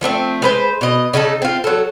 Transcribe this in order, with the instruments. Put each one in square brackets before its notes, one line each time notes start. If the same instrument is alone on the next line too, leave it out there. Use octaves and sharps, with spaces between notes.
[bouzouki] F3 A3 B3 C4
G#3 B4 C5
B2 D#5
C#3 D#4 G4 A4
C4 F4
F#3 A4